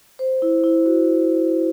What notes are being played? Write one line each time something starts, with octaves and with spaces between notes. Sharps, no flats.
C5
E4
E4
F#4